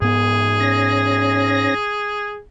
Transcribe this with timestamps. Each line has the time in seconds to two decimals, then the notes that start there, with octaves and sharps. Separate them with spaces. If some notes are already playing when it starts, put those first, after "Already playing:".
0.02 G#2 B3 G#4
0.60 C#4 A#6